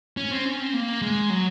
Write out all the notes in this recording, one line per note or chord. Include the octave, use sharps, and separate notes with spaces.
C#4
C4
C#4
C4
A#3
G#3
F#3